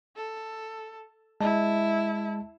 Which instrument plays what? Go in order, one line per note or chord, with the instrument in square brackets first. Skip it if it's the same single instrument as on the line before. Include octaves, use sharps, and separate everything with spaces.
[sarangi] A4
[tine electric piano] G#3 A5 [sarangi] E4